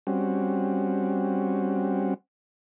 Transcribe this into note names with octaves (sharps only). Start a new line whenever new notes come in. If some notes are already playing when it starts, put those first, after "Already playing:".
G3 C4 C#4 F#4